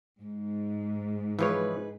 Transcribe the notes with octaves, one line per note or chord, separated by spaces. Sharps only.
G#2
E3 F3 D#4 G#4 B4 C#5